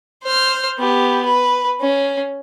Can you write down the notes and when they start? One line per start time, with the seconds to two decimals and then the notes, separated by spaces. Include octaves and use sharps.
0.23 C5 F6
0.78 B3 G4
1.25 B4
1.81 C#4